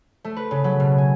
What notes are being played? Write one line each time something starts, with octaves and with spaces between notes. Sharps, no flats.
A3
B4
C#3
F#3
B2
G#5